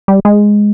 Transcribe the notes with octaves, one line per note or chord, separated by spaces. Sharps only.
G3
G#3